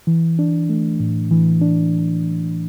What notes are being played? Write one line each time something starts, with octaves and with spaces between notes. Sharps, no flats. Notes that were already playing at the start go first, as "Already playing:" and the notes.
E3
D4
A3
A2
E3
D4